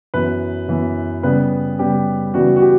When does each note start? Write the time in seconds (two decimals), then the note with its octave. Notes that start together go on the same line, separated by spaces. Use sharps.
0.14 F#2 E3 B3 B4
0.68 F#2 E3 B3
1.23 C#3 G3 B3 B4
1.79 C#3 G3 B3 G4
2.34 C#3 E3 G3 B3 F#4
2.56 F#4
2.62 G4